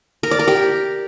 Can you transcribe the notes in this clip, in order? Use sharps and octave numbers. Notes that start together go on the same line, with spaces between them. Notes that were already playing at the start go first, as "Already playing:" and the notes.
A#4
D5
A#4
G4